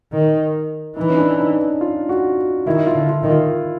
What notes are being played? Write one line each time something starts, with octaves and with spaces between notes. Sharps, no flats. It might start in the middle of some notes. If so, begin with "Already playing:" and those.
D#3
E3 D#4
C#4
D4
D#4
F4
F#4
D#3 E4
F4
D3
F4
D#3
F4